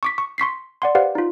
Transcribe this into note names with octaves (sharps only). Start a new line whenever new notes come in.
C#6 D6 B6
C#6
C6 C#6 B6 C7
D5 F#5 C6
G4 B4 C5 D5 F5 F#5
D#4 F4